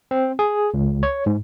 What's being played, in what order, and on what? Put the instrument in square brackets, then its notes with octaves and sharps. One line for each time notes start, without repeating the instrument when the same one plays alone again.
[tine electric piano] C4
G#4
C#2
C#5
G#2